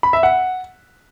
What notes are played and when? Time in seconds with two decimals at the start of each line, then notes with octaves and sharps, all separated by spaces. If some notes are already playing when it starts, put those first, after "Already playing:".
0.03 B5
0.13 E5
0.23 F#5